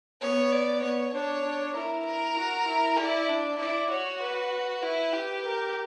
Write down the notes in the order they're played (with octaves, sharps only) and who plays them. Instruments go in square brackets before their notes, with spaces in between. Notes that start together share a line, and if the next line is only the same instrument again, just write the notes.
[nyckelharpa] B3 [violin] C#5
[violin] D5
[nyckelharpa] B3 [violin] C#5
[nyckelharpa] D4 [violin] C#5
[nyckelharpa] D4
[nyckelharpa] E4 [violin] A#4
[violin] A#4
[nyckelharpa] F#4
E4
[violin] E4 [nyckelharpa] D5
[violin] D4
[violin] E4 [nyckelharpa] D5
[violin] F#4 [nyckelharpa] C#5
[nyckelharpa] B4
[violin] E4 [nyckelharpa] B4
[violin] G4
[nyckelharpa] A#4